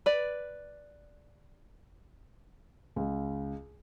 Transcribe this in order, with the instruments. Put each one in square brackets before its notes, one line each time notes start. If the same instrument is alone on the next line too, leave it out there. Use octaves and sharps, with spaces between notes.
[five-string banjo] B4 D5
[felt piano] C#2